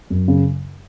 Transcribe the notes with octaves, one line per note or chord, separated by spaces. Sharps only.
F#2
C#3